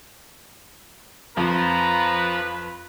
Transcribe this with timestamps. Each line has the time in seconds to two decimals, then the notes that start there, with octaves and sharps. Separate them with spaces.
1.37 F2 F3 B4 A#5